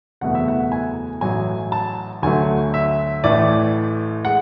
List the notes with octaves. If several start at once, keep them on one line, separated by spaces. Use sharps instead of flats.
F#1 E2 B2 A3 F#5
E5
F#5
G#5
A1 A2 F#3 G#5
A5
D2 D3 F#3 A3 G#5
E5
A1 A2 E3 A3 D5
G#3 F#5